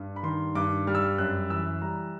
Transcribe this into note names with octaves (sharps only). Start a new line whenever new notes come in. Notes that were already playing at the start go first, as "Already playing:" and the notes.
Already playing: G2 G3
B5
D#3 C6
G2 D6
G3 F6
E6
F6
F#2 F#6
E3 E6
G3 A#5